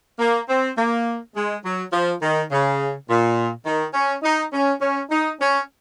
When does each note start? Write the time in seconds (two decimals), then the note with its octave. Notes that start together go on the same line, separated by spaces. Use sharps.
0.19 A#3
0.48 C4
0.76 A#3
1.35 G#3
1.63 F#3
1.91 F3
2.21 D#3
2.50 C#3
3.08 A#2
3.65 D#3
3.93 C#4
4.23 D#4
4.52 C#4
4.80 C#4
5.09 D#4
5.39 C#4